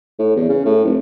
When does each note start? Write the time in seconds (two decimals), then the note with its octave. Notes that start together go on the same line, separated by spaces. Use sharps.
0.19 A2
0.36 E2
0.49 C#3
0.65 A2
0.85 F1